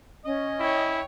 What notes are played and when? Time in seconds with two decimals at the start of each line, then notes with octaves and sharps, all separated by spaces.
0.25 C#4 D#5
0.59 E4 C#5 G5